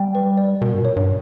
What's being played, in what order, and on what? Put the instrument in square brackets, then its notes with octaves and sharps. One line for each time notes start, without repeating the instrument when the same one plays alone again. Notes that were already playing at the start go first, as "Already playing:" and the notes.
Already playing: [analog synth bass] G3 [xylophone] G5
[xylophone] B4
D5
[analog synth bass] B2 [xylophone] A#4
[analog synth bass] G2
A#2
[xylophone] C#5
[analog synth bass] G2